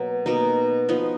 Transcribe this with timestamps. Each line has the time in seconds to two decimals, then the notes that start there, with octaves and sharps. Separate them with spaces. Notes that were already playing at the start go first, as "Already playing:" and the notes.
Already playing: B2 F#3 A#3
0.26 B2 A#3 D#4
0.89 F3 B3 D#4